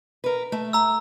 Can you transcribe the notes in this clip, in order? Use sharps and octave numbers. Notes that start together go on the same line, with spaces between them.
A#4 B4
A3
A#5 E6